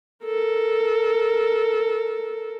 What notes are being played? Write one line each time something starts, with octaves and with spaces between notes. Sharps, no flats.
A4 A#4